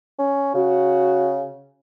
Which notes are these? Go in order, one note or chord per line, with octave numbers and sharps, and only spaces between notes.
C#4
C#3 F#4